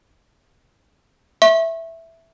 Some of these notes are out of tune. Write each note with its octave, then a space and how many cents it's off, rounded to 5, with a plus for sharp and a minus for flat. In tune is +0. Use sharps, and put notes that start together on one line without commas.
E5 +0 C#6 -35